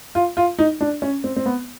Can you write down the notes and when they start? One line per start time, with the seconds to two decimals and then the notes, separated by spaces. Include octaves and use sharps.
0.15 F4
0.37 F4
0.59 D#4
0.81 D4
1.02 C#4
1.24 C4
1.36 C4
1.46 B3